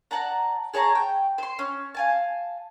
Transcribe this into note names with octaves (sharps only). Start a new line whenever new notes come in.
D5 F#5 A5 A#5
G#4 C#5 A5 A#5
G5
C5 C6
C#4
F5 G#5 A5